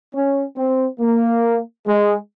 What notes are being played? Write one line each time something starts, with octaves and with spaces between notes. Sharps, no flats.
C#4
C4
A#3
G#3